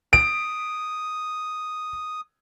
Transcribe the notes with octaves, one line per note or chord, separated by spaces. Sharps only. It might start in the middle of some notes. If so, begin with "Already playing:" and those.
D#6 D7